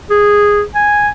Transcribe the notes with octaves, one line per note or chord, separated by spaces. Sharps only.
G#4
G#5